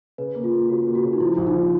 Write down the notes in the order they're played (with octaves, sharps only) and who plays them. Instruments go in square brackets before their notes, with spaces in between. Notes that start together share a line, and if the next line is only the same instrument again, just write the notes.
[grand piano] C#3 [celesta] B4
[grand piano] A#3
[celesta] F4
[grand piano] A#3
[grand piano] C#3 [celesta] F#4
[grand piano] A#3
[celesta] F#4
[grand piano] C#3
[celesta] D#4
[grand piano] F3 [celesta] E4
[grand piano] A#1
[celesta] D#4
[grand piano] F3